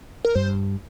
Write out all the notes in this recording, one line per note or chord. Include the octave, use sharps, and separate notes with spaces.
A#4
G2 C5